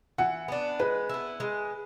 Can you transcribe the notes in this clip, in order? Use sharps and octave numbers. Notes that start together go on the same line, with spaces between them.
E3 F#5
B3 D4
G#3 B4
B3 E4
G#3